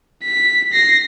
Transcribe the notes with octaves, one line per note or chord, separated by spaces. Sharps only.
B6
A#6 C7